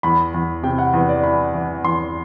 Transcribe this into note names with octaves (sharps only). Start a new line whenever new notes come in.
E2 B5
E2
C3 G5
F#5
E2 B4
D5
E3 B5
E3
E2 C6